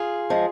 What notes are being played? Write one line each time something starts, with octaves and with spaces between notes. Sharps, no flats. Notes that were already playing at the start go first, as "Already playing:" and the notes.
Already playing: F4 G#4
F3 G#3